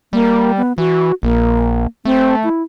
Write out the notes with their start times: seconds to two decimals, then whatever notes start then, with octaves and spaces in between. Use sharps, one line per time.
0.13 G3 A#3
0.57 B3
0.78 E3 F#4
1.23 A#1 A#3
2.05 A3 C4
2.44 E4